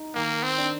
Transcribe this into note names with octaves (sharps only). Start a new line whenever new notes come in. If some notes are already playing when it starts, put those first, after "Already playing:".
Already playing: D#4
D#3 A#3
C4
D4